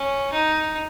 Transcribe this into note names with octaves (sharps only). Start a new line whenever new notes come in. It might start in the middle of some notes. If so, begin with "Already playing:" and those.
Already playing: C#4
D#4